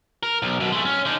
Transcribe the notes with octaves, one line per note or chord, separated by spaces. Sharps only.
A#4
B1
F#2 B2
G#3 A3
C#4
D3 D#4